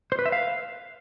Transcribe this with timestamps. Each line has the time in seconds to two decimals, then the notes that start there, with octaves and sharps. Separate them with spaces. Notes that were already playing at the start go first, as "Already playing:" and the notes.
0.12 C5
0.19 B4
0.26 E5
0.32 F5